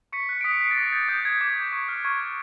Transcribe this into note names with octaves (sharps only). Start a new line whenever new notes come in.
C#6 B6 C#7
F#6
D7
D#6 B6 C#7
F#6 C7
A6
D6 A#6
G6 A6
D#6 G6
G6 G#6
D6 G#6
G6
C#6
F6
C#6 G#6
F6